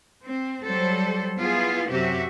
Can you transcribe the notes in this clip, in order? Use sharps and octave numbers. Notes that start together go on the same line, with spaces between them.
C4
F#3 G3 A4 C5
B3 E4 F4 G#4
F#2 C3 F#4 G4 E5